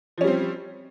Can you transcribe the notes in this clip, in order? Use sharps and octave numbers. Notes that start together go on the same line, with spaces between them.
F3 G3 C4 C#4